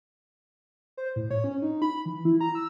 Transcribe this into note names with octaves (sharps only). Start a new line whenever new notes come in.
C5
A2
C#5
C#4
D#4
B5
E3
E4
A#5
E6